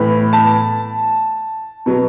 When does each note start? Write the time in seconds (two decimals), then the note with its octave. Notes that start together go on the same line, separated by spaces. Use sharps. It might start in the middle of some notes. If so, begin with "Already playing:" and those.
Already playing: A2 E3 B3 B5
0.33 A5
1.86 B2 F#3 B3